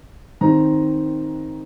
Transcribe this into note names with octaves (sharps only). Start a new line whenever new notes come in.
D#3 C4 D#4 A#5